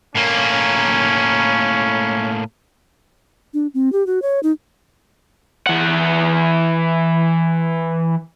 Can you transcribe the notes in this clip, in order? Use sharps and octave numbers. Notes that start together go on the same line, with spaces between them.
A2 A#3 C#4
D4
C4
G4
F#4
C#5
D#4
E3 F#5